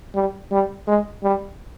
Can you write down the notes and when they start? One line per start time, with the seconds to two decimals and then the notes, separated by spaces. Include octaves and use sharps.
0.15 G3
0.52 G3
0.87 G#3
1.23 G3